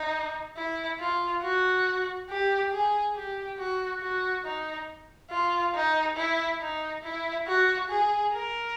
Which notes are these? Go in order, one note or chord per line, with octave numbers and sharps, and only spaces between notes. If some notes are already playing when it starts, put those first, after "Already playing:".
Already playing: D#4
E4
F4
F#4
G4
G#4
G4
F#4
F#4
D#4
F4
D#4
E4
D#4
E4
F#4
G#4
A#4